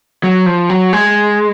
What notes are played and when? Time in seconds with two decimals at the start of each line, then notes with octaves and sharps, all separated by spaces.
0.23 F#3
0.46 F3
0.70 F#3
0.93 G#3